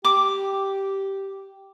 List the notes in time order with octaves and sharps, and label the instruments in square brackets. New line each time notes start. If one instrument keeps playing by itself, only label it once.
[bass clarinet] G4 [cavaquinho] D6